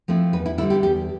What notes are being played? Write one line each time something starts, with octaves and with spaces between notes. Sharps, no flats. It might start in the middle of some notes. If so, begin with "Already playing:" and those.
F3 A3 C4 E4
E2 B4
E4
D3 G3 E4
G4
E2 G4